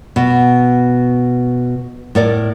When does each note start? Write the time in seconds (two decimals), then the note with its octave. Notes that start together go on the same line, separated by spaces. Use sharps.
0.16 B2
2.15 A2 A#4 D5